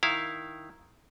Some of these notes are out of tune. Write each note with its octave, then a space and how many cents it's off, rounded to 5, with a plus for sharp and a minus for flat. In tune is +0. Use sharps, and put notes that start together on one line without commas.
D#3 +0 E4 +0 F5 +0